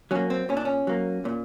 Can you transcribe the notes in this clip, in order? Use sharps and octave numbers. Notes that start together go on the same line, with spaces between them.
F#3 A#3 C#4
C4
A#2 C#4
D4
C#4
F#3 A#3
A#2